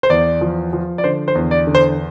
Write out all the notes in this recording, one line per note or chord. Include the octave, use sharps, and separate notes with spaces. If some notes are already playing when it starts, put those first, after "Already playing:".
C5
E2 D5
F3
F3
D5
D3 C5
C5
E2
D5
D3
C5